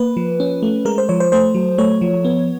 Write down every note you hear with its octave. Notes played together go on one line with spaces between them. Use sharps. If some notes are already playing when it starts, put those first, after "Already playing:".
Already playing: A#3 B4
F3
C#4
A3
G#3 A#4
C5
F3 C#5
C5
A3 C5
F#3
A3 C#5
F3
B3